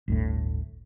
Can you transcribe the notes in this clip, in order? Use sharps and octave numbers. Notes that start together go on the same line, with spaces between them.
G1 D2 A2